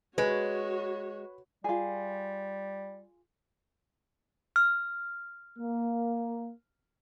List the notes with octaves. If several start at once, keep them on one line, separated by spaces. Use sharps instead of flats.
G#3 F#4 B4 C#5
G3 F4 G#4
F6
A#3